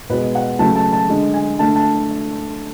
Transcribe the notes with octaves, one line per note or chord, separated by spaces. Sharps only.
B2 G#3 B4
F#5
C#3 F#3 A3 A5
A5
A5
D3 G#3
G#5
D3 A3 A5
A5